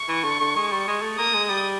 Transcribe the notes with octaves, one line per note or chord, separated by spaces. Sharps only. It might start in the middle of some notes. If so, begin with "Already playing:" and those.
Already playing: C#6
E3
D3
D3
G#3
G3
G#3
A3
A#3 D#6
G#3
G3